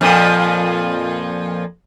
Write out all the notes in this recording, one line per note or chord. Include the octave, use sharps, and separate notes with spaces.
F2 A#2 F3